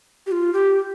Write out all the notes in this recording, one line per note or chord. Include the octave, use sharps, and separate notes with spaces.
G4
F4
G4